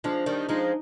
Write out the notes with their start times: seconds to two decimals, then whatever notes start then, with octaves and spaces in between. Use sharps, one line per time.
0.04 F3 G#3 D4
0.26 D#3 G3
0.49 F3 G#3 D#4